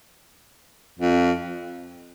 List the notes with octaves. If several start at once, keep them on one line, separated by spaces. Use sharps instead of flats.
F2